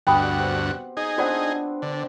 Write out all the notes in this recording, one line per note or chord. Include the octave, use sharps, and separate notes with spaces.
D2 G2 B2 F#4 G4 G5 B5 D#6
C4
D#4 G#4
B3 C4 D4 F4 D5 F#5
D3